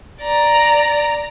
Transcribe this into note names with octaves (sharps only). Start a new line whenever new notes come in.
D5 A#5